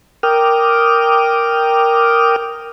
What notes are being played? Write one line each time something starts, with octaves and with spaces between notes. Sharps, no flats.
A#4 G5 D6 D#6 F6